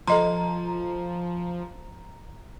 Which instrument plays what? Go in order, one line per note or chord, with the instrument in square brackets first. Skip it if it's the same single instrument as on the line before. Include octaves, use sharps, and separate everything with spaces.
[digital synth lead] F3 [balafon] A4 D#5 C6 [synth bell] A#5